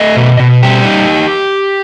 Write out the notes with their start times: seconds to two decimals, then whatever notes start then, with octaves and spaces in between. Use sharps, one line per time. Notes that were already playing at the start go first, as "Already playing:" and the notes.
Already playing: A3 D#5
0.16 B2
0.40 B2
0.62 G3 G4
0.84 D#4